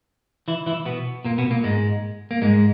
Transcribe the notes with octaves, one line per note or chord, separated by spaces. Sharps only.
E3 E4
E3 E4
B2 B3
A#2 A#3
B2 B3
A#2 A#3
G#2 G#3
A#3
G#2 G#3